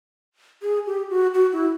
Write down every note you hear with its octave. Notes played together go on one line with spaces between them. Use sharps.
G#4
G4
F#4
F#4
E4